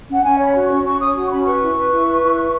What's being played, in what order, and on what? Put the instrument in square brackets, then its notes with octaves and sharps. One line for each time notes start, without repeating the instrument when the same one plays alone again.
[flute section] C#4 F#5
C#4 G#5
C#5
B5
F#4
C#6
C#4
C#4 C#6
C#5 D#6
F#4
C#6
C#4 B5
B4 C#6
E4
B4
E4
B4
E4
B4